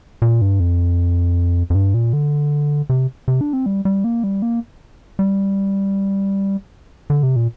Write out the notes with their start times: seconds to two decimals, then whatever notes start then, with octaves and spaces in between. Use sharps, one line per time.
0.22 A#2
0.41 G2
0.60 F2
1.70 F2
1.75 G2
1.94 A#2
2.13 D3
2.90 C3
3.28 C3
3.41 D4
3.53 C4
3.66 G3
3.85 G3
4.04 A#3
4.24 G3
4.42 A#3
5.19 G3
7.10 D3
7.23 C3
7.36 A#2